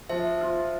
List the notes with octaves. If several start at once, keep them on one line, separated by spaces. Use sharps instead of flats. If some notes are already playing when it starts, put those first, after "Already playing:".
F3 C5 E5
F4